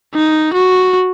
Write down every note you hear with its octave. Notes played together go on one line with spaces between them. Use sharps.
D#4
F#4